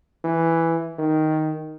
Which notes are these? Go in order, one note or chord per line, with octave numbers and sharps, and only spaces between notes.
E3
D#3